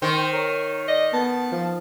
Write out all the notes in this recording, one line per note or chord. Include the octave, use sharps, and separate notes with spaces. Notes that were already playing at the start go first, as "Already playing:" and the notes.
D#3 C5
A#4 C#5
D5 D#5
B3 A5
F3